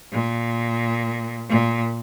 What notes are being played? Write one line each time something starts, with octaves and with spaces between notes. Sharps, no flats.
A#2
A#2